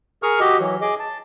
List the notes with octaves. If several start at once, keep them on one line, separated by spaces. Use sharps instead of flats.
G#4 A#4 C#6 D#6 F6
F#4 G4 D#5
E3 F#3
G#4 D#5 D6
A5